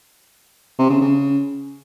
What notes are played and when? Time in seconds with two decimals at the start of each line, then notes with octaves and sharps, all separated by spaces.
0.79 C3
0.90 C#3
1.01 C#3